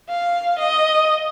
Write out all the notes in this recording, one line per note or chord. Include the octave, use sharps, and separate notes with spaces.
F5
D#5